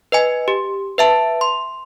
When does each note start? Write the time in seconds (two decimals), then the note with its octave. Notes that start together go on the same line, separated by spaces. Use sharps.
0.12 B4 D#5 G#5
0.48 G4
0.98 B4 E5 A5
1.41 C6